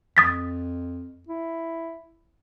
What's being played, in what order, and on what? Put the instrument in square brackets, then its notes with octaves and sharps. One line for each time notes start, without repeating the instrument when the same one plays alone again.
[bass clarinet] F2 [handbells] D#6 A6 B6
[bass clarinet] E4